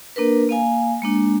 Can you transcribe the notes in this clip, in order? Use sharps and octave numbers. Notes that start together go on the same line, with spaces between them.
A#3 D4 A#4 B4
A#3 F5 G#5
G#3 A#3 D4